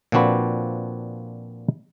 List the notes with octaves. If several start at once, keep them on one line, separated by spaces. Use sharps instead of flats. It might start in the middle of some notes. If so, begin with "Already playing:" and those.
A#2 F3 C4 D4 F#4 B4